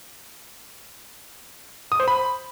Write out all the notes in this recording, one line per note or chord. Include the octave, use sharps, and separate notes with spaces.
D#6
C5
B5